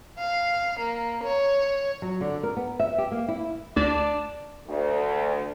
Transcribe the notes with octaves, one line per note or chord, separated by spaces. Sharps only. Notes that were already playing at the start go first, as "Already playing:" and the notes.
F5
A#3
C#5
F#3
D3
A#4
B3
E5
G4
A#3
E4
D2 D4
D2